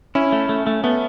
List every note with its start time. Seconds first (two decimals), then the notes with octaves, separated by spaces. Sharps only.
0.15 C#4 E4
0.32 A3
0.49 A3
0.67 A3
0.84 A3 B3